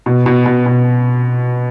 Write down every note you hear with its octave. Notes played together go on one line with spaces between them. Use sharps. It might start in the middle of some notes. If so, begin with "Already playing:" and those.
B2
B2
B2
B2